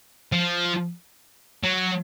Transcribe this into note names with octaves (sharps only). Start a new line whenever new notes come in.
F3
F#3